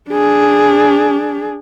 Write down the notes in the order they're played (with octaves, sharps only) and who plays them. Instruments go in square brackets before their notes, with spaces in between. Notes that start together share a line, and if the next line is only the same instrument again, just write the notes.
[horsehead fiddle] D4 G#4